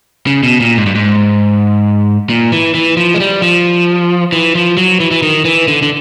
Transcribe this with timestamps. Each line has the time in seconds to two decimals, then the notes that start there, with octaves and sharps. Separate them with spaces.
0.27 C#3
0.43 B2
0.60 A#2
0.77 G#2
0.86 G2
0.95 G#2
2.30 A#2
2.52 E3
2.75 E3
2.97 F3
3.14 G#3
3.20 G3
3.42 F3
4.32 E3
4.55 F3
4.77 F#3
5.00 E3
5.11 E3
5.23 D#3
5.45 E3
5.68 D3
5.82 D3